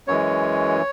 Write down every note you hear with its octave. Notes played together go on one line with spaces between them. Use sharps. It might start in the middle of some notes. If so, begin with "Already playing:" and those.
F#2 E3 G#3 C#5